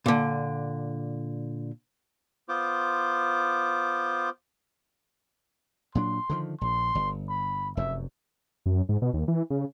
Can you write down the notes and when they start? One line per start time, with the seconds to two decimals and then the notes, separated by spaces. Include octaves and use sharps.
0.06 A#2 D3
2.49 B3 F4 C5 D6
5.95 A#2 F#3 D4 C6
6.30 D3 D#3 F3
6.61 A#1 C6
6.95 G1
7.29 B5
7.77 F1 F#2 E5
8.66 F#2
8.89 G#2
9.02 B2
9.14 D#2
9.28 E3
9.50 C#3